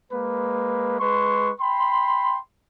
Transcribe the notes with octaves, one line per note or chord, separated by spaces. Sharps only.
G#3 A#3 B4
G#3 B4 C6 C#6
G5 B5 C6